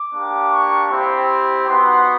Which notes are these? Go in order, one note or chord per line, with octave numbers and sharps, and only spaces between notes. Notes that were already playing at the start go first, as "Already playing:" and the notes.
Already playing: D6
A#3 D4 G4
C#6
C4 E4 G4
B3 D#4 F#4 C6